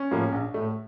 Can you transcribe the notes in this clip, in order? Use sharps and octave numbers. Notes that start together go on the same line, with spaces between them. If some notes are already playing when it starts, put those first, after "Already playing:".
Already playing: C#4
A2 F3 A#3
A#1
A2 A3